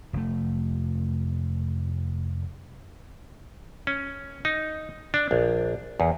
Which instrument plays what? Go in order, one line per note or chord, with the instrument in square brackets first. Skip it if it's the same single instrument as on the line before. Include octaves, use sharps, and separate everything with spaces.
[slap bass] F1 A3
[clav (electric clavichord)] C#4
D#4
D4
A#1
E2